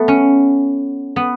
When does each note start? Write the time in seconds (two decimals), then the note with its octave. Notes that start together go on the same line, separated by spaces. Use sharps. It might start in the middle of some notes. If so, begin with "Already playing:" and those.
Already playing: A3 B3
0.08 C#4
1.16 B3